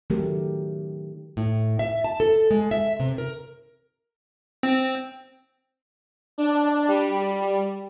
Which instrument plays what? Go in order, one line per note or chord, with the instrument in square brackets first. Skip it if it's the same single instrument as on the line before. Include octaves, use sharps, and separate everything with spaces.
[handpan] D#3 F#3 A3 C#4 G4 A#4
[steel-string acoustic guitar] A2
E5
A5
A4
G#3
E5
C3
A#4
[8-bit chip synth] C4
[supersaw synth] D4
G3